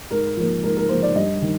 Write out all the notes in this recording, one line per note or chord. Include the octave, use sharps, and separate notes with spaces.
G#2 A#4
F3 A#3
G#2 A#4
A#4
F3 A#3 C5
D5
G2 D#5
D#3